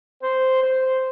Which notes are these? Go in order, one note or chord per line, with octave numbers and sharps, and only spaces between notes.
C5
C5